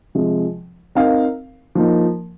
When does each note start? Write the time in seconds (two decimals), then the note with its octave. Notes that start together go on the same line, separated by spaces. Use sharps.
0.15 C3 F3 G#3
0.95 C4 D#4 A#4 F5
1.75 F3 A#3 D#4